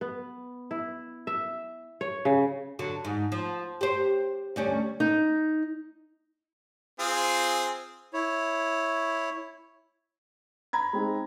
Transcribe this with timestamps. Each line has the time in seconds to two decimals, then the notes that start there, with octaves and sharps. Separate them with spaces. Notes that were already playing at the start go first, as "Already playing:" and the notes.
0.01 B3
0.71 E4
1.27 E5
2.01 C#5
2.25 C#3
2.79 D3 F#3
3.05 G#2
3.32 F3
3.81 G4 C5
4.56 D2 G3 C#4
5.00 D#4
6.99 C4 F4 G#4
8.13 E4 C#5
10.73 A#5 B5 G#6
10.93 G#3 C4 D#4